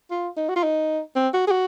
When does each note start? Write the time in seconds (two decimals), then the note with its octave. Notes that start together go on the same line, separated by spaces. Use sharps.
0.11 F4
0.37 D#4
0.49 F#4
0.56 F4
0.63 D#4
1.16 C4
1.34 F#4
1.47 G#4
1.51 F#4